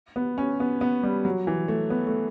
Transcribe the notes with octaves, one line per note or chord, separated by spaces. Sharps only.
B3
C#4
B3
B3
G3
F#3
E3
A3
B3
A3